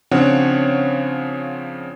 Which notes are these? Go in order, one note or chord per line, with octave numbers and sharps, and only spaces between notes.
C#3 F3 C4 D4 C#5 F#5